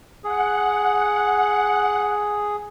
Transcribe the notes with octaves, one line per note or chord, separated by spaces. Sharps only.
G#4 F#5